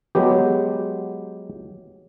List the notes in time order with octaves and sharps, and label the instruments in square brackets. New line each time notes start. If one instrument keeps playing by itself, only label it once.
[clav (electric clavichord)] F#3 G#3 B3 G4